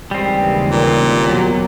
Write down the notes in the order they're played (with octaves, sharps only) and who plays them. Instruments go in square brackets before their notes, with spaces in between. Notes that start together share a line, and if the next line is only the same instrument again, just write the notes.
[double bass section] D#2 C#3 E3 [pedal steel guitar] G3 C4 [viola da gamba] G#3
[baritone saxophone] A#2
[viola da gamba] B2 F#3